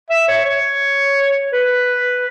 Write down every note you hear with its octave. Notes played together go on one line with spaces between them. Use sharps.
E5
C#5
C#5
B4